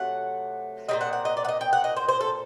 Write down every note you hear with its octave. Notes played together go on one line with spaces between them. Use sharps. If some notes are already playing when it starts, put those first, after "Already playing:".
Already playing: C3 F#3 A3 F#5
A#2 G3 C4 D#5
F#5
F#5
D#5
D5
F#5
D#5
G5
F#5
D#5
C5
C5
A4